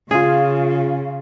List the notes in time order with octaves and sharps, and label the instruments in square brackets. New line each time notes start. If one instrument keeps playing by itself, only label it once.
[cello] C#3 [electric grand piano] C#4 F4 [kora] G#4 [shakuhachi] F5